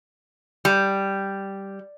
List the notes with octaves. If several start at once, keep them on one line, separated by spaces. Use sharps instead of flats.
G3